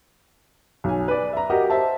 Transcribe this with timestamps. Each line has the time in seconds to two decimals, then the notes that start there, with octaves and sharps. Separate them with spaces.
0.84 B1 G#5
1.08 B4 D5
1.33 E5 A#5
1.50 F#4 G4 A#4 D#5
1.70 C5 E5 A5